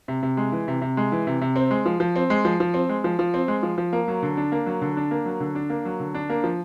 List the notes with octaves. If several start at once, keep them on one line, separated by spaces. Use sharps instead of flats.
C3
C3
G#3
E3
C3
C3
G#3
E3
C3
C3
C4
G#3
F3
F3
C4
G#3
F3
F3
C4
G#3
F3
F3
C4
G#3
F3
F3
A#3
F#3
D3
D4
A#3
F#3
D3
D4
A#3
F#3
D3
D4
A#3
F#3
D3
D4
A#3
F3